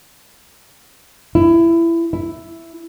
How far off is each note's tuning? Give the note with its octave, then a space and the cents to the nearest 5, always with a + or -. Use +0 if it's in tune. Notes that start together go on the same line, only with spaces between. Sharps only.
E4 +20
E4 +5